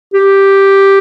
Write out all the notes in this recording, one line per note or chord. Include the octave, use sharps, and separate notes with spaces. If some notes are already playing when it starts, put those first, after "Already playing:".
G4